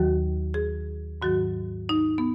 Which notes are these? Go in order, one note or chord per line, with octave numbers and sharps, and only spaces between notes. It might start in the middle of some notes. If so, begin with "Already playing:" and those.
Already playing: D#2 D#3 F#3 F#4
G#4
G#2 D#3 F#3 F#4
D#4
B3